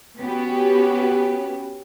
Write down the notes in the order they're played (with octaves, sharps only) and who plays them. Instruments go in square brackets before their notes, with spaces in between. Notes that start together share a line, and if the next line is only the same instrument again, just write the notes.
[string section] B3 C#4 F#4 G4 B4